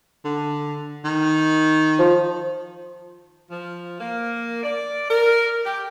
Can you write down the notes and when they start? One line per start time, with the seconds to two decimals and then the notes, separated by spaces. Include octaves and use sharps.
0.25 D3
1.05 D#3
1.99 F3
3.51 F3
4.00 A#3
4.64 D5
5.11 A#4
5.66 G4